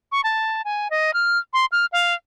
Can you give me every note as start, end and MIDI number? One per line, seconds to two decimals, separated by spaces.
0.12 0.21 85
0.24 0.62 81
0.65 0.88 80
0.91 1.14 75
1.14 1.39 89
1.53 1.66 84
1.72 1.86 89
1.92 2.14 77